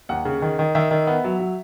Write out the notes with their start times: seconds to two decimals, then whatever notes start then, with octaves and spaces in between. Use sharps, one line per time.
0.09 D#2 F#5
0.25 C#3
0.42 D#3
0.59 D#3
0.75 D#3 E5
0.91 D#3
1.07 B3
1.24 F#3
1.40 F#3